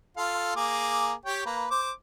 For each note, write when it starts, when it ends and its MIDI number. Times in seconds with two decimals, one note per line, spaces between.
0.17 0.52 65
0.17 0.52 69
0.17 0.52 77
0.56 1.12 58
0.56 1.12 68
0.56 1.12 86
1.25 1.43 67
1.25 1.43 73
1.25 1.43 79
1.46 1.66 58
1.46 1.66 71
1.71 1.91 72
1.71 1.91 86